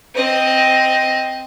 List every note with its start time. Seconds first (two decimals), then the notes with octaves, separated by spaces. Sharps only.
0.15 C4 D#5